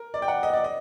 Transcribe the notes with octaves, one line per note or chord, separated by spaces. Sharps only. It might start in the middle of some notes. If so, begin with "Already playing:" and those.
Already playing: A#4
D5
G5
F#5
D#5
D5
D#5